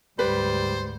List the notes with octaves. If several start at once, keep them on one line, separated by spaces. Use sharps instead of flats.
D2 G#2 G3 B4 C5